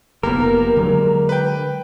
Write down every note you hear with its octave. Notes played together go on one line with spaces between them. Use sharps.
F1 A#3 B3 G4 A#4
D3 F#3 G#3
B4 G5